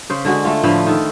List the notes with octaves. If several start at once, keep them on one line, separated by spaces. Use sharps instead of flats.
C#3 C5
D3 G#3 F#4
A3 F4
A2 D3 F3 B4
D#3 A4